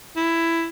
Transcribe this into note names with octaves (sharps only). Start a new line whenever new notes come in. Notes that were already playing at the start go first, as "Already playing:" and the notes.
E4